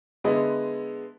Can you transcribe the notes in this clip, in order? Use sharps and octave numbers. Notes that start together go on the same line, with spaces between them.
D3 G#3 B3 E4 D#5